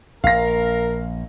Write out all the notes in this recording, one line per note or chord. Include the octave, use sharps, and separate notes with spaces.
A#1 A#4 F5 A#6